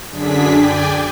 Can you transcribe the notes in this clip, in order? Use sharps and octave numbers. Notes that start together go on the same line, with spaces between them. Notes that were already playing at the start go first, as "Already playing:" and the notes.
F#2 D3 D4 G#4 B6
D5 G5 G#5